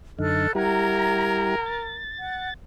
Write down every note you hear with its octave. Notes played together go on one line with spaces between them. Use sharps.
F#2 D3 D#4 A4 F6 F#6
G3 E4 G4 A#4 F#5 A#5 G#6
A6
F#5